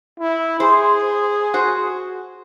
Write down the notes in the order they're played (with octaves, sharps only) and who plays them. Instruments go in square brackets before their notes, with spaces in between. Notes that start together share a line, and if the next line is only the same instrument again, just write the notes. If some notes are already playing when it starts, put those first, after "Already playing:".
[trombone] E4
[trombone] G#4 [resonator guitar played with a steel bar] C5
[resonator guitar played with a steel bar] F#4 C5